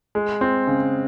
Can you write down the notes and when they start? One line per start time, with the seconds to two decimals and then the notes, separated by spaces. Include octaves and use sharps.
0.15 G#3
0.41 C4
0.67 C#3